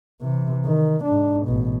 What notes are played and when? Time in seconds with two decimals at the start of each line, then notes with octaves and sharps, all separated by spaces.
0.22 C3 E3
0.66 D#3
1.04 G#2 D4
1.46 A1 B2